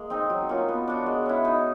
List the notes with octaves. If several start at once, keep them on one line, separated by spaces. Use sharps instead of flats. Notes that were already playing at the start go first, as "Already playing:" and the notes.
Already playing: G#3 A#3 G#4
C4 D#4
F#3
A#3 C#4 F4
B3
D4 F#4
G#3
C#4 E4
D#4